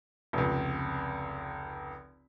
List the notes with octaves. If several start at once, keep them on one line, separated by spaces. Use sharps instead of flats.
F1 C#2